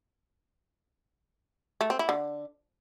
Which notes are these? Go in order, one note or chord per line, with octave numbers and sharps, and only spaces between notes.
A3
C4
E4
D3